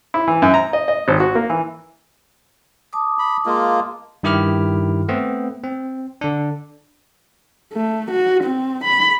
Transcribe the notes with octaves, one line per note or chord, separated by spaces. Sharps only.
E4
E3
F#2
A#5
D#5
D#5
G#1
F#4
A#3
E3
A5 D6 D#6
B5
G#3 A#3 F4
G2 D#3 E4 G4 D6 F6
A3 B3 C4
C4
D3 D4
A3
F#4
C4
B5